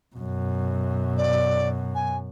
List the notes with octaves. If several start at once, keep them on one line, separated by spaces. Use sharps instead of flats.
F#2 B2
D5
G#5